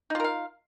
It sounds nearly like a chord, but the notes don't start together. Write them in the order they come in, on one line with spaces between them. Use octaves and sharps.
D#4 F4 A#4 F5